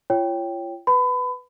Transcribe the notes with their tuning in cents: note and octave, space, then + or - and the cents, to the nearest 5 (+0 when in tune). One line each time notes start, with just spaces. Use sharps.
F4 -35 C#5 +0 G5 +0
B4 +5 B5 +30